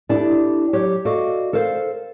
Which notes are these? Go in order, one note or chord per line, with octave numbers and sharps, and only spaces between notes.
D4 E4 G4 A4 D5
F#3 G4 C#5
F#4 A4 D5 D#5 F5
A4 A#4 C5 F5